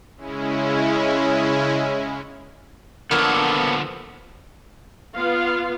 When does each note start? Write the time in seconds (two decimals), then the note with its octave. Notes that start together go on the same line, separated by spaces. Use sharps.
0.17 C#3 G#3 C#4 E4
3.11 D3 F3 A#3 B3 A4 C#5
5.15 B3 F4 F5